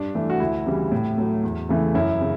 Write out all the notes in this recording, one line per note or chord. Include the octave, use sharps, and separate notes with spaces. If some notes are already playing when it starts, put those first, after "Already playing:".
Already playing: G2 D4
E3 A3
F#4
D2 E4
C#3 E3 G3
A2
F#3 A3
E2
C#3 E3 A3
F#2 E4
C#3